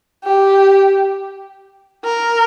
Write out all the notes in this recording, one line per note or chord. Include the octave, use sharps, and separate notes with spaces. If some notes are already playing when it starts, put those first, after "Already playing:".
G4
A#4